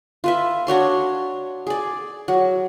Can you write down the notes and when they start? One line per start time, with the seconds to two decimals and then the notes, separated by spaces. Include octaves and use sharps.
0.24 F4 B4 E5
0.67 D4 F#4 C#5 C6
1.67 G#4 D5
2.28 F#3